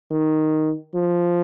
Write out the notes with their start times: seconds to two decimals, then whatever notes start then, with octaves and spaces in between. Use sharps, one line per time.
0.11 D#3
0.95 F3